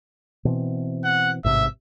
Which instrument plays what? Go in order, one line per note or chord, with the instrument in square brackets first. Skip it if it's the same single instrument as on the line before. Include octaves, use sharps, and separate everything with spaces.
[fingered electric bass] B2 E3 C4
[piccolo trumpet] F#5
[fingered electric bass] A1 G#2 C3 [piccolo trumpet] E5